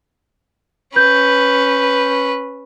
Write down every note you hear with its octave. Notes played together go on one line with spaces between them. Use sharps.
C#4 B4 G6